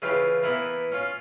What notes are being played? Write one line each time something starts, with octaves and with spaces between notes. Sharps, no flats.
C#3 E3 F4 G4
E3 A#3 B3 E4
C#4 F4